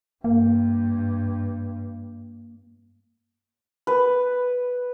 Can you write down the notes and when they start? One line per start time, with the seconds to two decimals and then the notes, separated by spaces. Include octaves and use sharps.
0.24 G2 A#3
3.87 B4